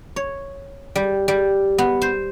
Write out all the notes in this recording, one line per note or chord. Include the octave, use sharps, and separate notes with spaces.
C#5
G3
G3
B3
C5